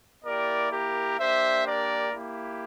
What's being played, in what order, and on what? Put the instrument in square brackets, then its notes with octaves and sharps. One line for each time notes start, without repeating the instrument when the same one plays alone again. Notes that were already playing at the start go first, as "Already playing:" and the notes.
[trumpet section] A#3 E4 G4 A#4 D5
G4 A#4
A#3 D4 G4 C5 E5
A#4 D5
A#3 E4 G4